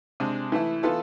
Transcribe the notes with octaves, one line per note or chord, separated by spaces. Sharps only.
C3 G#3 D4
E3 A3 E4
E3 B3 F4 A4